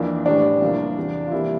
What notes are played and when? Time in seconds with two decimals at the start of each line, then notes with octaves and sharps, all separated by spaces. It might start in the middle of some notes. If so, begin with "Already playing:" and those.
Already playing: F2 E3 A#3 D4
0.25 A1 A2 E3 G3 D4
0.62 C2 C3 F3 A#3
0.97 E2 C3 F3
1.27 F4
1.32 E2 C3 G3 A#3 E4